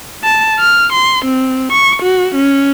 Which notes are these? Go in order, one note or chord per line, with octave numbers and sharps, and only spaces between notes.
A5
F6
C6
C4
C#6
F#4
C#4